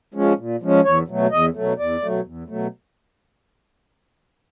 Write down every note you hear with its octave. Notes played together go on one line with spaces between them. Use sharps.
F3 G#3 C#4
A#2
F3 G#3 C#4
E2 C#5
B2 F#3 A3
E2 D#5
B2 F#3 A3
E2 D5
B2 F#3 A3
E2
B2 F#3 A3